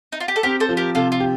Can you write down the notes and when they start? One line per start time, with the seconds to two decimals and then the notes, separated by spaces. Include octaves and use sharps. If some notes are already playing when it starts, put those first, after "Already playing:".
0.12 D#4
0.20 F4
0.28 G4
0.36 A4
0.43 C4 G4 A#4
0.60 A4 C5
0.69 F3
0.77 G4 A#4
0.95 C3 F4 A4
1.12 F4
1.20 G4